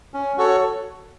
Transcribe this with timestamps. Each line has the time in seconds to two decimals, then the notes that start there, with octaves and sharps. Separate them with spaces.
0.14 C#4
0.38 F#4 A4 C#5